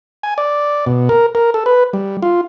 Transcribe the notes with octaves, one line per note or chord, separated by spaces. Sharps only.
G#5
D5
B2
A#4
A#4
A4
B4
G3
F4